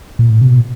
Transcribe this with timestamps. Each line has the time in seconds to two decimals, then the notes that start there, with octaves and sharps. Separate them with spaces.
0.19 A#2
0.30 A2
0.41 C3
0.48 B2